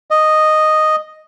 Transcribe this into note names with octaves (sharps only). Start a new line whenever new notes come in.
D#5